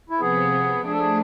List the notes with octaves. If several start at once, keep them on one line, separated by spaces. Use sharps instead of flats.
E4
C3 F3 B3 G#4
F3 A3 D4 G#4
A4
G#4